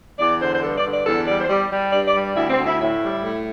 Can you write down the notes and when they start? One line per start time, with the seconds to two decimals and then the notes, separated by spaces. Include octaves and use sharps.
0.19 E2 D5
0.40 D3 C5
0.55 C5
0.62 G2 A4
0.77 D5
0.84 D3
0.91 D5
1.06 E2 A4
1.27 G3 D5
1.41 C5
1.49 G3 D5
1.71 G3
1.93 G2 D5
2.07 D5
2.14 G3
2.35 D2 E4
2.50 C4
2.57 D2
2.65 E4
2.80 A2 E4
3.02 G3
3.23 A2